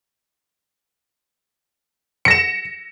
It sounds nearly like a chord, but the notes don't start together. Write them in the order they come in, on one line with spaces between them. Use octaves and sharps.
C#7 A#6 E7